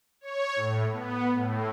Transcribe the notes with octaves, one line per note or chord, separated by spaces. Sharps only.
C#5
A2
B3
A2